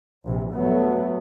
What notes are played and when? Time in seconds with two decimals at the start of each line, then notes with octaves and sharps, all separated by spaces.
0.24 A#1 C3 E3
0.53 G2 F#3 A3 B3